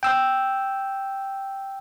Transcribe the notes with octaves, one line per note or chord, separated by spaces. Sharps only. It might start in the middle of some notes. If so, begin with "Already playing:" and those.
G5 E6